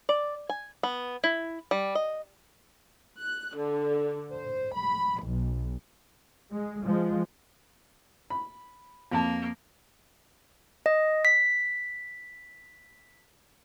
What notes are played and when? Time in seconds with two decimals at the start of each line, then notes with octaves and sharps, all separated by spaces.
0.09 D5
0.50 G#5
0.83 B3
1.24 E4
1.71 G3
1.95 D#5
3.21 F#6
3.57 D3
4.31 C5
4.75 B5
5.23 B1
6.52 G#3
6.86 F3 G#3
8.30 B5
9.12 F2 A#3 A5
10.86 D#5
11.25 B6